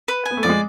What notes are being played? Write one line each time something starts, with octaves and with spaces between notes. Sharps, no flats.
B4
G#5
B3
A3
F3 D5
G#3